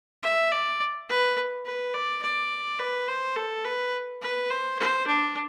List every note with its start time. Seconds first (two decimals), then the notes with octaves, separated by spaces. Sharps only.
0.23 E5
0.52 D5
1.09 B4
1.65 B4
1.94 D5
2.22 D5
2.79 B4
3.08 C5
3.36 A4
3.64 B4
4.21 B4
4.50 C5
4.79 C5
5.07 D4